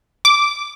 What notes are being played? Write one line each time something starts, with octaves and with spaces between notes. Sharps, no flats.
D6